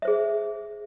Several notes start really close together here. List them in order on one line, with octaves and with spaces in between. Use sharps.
E5 C5 G#4